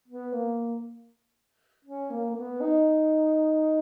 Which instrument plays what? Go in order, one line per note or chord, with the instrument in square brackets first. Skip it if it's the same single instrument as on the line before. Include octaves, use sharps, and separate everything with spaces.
[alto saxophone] B3
A#3
C#4
A#3
A#3
B3
D#4